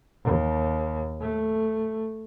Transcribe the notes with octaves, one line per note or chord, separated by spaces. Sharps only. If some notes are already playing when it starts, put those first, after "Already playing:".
D#2
A3